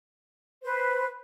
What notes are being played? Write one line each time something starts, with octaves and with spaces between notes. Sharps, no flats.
B4 C5